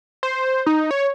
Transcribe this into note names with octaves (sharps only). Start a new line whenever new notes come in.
C5
D#4
C#5